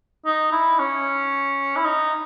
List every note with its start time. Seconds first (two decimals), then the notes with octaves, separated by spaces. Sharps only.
0.26 D#4
0.52 E4
0.79 C#4
1.76 E4
1.85 D#4